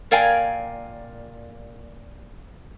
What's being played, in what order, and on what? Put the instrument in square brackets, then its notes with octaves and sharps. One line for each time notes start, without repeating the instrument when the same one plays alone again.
[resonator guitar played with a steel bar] A#2 A#4 D5 F5 G5 G#5